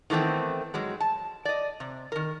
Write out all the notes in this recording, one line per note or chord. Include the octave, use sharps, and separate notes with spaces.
D#3 E3 A3 B3 C4
G#2 F#3 G#3
A5
D5 D#5
C3
D#3 A#4